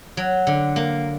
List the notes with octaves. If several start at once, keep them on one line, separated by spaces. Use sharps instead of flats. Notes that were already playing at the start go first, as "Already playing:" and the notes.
F#3
D3
A#3